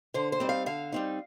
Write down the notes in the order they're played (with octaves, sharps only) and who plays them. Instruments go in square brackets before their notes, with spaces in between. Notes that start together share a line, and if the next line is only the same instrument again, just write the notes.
[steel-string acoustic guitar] D3 C5
C5
G3 C4 D#4
F5
D3 F5
G3 C4 D#4